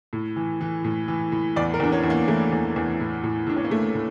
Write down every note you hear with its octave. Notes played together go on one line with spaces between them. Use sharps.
A2
E3
E3
A2
E3
A2
E2 D5
A#4
E2 D4
C#4
E2
A#3
E3 A3
E2
E2
A2
A2
A2 D4
C#4
A#3
A2 A3
A2